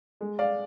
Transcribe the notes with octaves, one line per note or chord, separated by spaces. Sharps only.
G#3
D5 F5